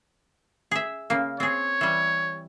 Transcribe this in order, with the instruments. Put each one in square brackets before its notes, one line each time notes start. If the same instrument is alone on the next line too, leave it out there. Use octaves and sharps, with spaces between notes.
[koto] G#4 E5
C#3 A#3
[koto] C4 G#4 [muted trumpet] C#5
[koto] E3 G3